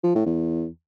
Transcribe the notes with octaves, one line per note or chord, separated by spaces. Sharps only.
F3
A2
E2